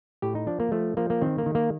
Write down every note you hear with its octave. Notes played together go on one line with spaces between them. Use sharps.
A2 G4
D#4
F3 D4
A#3
F3 A3
F3 A#3
A#3
D#3 C4
A#3
D#3
A#3